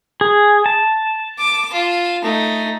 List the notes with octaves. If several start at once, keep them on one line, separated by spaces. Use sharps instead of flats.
G#4
A5
D6
F4
A3 D#4